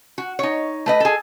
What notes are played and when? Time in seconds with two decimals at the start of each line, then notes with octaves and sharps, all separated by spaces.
0.18 F#4
0.39 D#4 C#5
0.86 A3 B4 D#5
1.00 G#4 A4